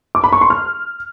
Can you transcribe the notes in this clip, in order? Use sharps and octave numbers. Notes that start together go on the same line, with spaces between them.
D6
B5
C#6
C6
F6